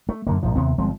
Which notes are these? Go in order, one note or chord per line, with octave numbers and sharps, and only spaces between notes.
A3
F#2 D3 A#3
A#1 G#2 F3
D#2 C3 B3 C4
G1 F3 G#3 C4